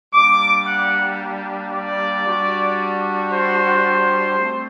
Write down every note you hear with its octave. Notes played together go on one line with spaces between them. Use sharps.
G3 A#3 D4 D6
F#5
D5
G3 D4 F#4
C5
A3 C4